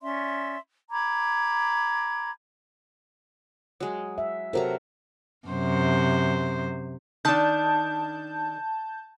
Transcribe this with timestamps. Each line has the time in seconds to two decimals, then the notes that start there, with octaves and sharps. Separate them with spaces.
0.02 C#4 D5 E5 C6
0.90 A#5 B5 D6 G#6
3.80 F#3 G#3
4.18 E5
4.53 C3 F#3 A4 A#4 A#5
5.48 F#2 C3 C5
7.25 D#3 D4 A5 G6